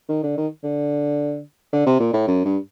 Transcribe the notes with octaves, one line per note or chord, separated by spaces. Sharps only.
D#3
D3
D#3
D3
D3
C3
A#2
A2
F#2
G2